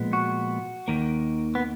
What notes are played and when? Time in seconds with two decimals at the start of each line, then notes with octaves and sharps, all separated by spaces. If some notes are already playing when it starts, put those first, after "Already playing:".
Already playing: A#2 F3 G#3 B3
0.13 F#4
0.88 D#2 D#3 A#3
1.55 B3